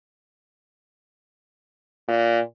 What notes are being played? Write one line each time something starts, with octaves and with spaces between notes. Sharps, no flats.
A#2